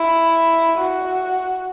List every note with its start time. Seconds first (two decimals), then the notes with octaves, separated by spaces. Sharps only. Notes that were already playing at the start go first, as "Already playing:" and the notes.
Already playing: E4
0.78 F#4